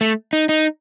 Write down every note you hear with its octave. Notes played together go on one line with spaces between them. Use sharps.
A3
D#4
D#4